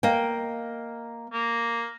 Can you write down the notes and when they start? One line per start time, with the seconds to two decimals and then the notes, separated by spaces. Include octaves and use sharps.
0.03 A#3 D#5 G5
1.33 A#3